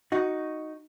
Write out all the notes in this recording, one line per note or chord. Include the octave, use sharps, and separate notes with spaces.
D#4 F#4